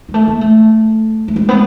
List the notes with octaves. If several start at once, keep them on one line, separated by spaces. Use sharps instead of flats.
G#3
A3
A#3
A3
A3
G#3
B3